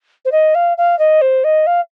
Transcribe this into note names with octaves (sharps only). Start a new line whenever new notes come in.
C5
D#5
F5
F5
D#5
C5
D#5
F5